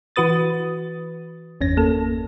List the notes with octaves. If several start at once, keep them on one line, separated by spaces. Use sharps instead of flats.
E3 F#4 B4 D#6 A6
G1 E2 C#4 A#6
A#3 A4